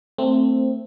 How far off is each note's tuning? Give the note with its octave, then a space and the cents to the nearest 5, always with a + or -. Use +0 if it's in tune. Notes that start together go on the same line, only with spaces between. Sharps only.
A3 +25 C4 +0